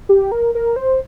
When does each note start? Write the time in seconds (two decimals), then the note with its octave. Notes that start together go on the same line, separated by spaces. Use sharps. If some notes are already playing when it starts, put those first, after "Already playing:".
0.09 G4
0.32 A#4
0.55 A#4
0.76 C5